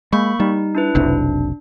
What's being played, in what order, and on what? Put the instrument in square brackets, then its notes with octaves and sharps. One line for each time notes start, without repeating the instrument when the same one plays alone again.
[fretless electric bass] G#3 [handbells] A#3 B5 C#6
[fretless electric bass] G3 [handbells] D#4
[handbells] D4 E4 B4
[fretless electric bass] F1 B1 C3 [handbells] D4